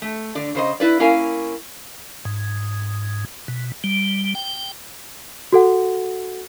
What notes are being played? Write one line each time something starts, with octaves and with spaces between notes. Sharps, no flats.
A3
D3 D5
C#3 C5 D#5
E4 B4 D5
A#3 C#4 E4 A#4 F5 G#5
G#2
B2
G3
G5
F#4 A4 F#5